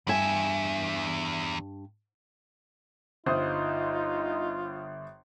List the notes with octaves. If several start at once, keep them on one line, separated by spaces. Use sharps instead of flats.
E2 G2 E5 G#5
G1 D#4 F4 C5 D#6